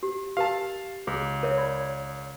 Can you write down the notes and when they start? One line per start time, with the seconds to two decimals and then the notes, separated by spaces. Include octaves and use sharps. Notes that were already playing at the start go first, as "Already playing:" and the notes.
0.03 G4
0.37 G4 A#4 F5 A5
1.07 C#2 G#4
1.43 A#4 C#5 E5
1.58 D5 B5